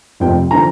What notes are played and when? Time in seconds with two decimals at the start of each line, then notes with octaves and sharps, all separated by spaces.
0.20 F1 F2 C3 F3 G5
0.51 D3 F3 A#5